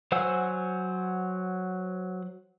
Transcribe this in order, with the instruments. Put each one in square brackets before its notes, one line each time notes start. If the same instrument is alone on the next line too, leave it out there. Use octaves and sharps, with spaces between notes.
[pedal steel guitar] F#3 C5 F#5 G#5 E6